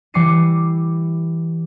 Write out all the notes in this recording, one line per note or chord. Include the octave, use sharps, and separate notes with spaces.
E3 G3 D6 C7 C#7 D#7